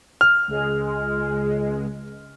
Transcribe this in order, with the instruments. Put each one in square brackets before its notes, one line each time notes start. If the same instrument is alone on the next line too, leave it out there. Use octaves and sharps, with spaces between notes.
[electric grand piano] F6
[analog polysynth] C#2 G#3